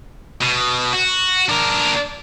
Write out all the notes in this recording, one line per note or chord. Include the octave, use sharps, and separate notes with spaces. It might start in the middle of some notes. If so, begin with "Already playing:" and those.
B2
F#4
D4 A#4